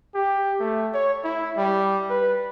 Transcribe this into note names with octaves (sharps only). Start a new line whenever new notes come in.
G4
A3
C#5
E4
G3
B4